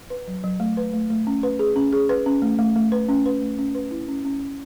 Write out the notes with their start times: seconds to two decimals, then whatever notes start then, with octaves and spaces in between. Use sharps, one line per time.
0.10 B4
0.28 F#3
0.44 F#3
0.60 A3
0.77 B4
0.94 A3
1.10 A3
1.27 C#4
1.43 B4
1.59 G#4
1.76 C#4
1.93 G#4
2.09 B4
2.26 C#4
2.42 A3
2.59 A3
2.76 A3
2.92 B4
3.09 C#4
3.26 B4
3.42 A3
3.59 C#4
3.75 B4
3.91 E4
4.08 C#4
4.25 C#4
4.41 C#4